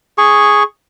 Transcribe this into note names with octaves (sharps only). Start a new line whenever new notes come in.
G#4 C#6